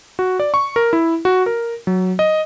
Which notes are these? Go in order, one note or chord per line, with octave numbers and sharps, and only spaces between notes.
F#4
D5
C#6
A#4
E4
F#4
A#4
F#3
D#5